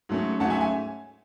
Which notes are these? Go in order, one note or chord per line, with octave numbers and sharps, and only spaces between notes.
G#2 F#3 A3 C#4
G#2 F#3 A3 C#4 F#5 A5
E5 G#5
E5 G#5